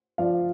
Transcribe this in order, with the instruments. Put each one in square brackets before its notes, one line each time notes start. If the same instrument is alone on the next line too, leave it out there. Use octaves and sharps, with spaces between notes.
[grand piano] F3 [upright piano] D5 F5